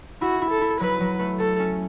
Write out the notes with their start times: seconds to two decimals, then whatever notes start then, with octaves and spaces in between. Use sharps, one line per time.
0.21 E4 F#4
0.42 E4
0.50 A4
0.61 E4
0.80 F#3 B4
1.00 F#3
1.19 A3
1.39 A3 A4
1.59 C#4